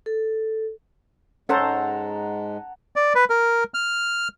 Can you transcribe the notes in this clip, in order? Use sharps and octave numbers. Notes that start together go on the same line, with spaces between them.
A4
G#2 G#3 C#4 A4 C5 F#5 A5 A#5
D5
B4
A#4
F6